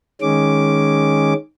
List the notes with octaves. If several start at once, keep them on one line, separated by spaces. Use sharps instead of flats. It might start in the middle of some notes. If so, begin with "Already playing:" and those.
D#3 G#3 C#4 D6